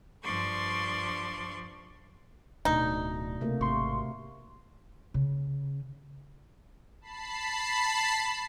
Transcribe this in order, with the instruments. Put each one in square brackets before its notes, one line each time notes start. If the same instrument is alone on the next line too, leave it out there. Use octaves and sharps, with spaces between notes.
[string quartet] G2 F3 D5 C6 C#6
[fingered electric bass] D1 [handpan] B2 A3 D4 [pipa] D#4
[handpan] C3 A3 A#3
[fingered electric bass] G#1 [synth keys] C6 C#6
[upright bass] C#3
[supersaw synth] A5 B5 C7